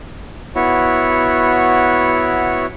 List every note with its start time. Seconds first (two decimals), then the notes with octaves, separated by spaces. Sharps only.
0.55 B3 E4 F#4 C#5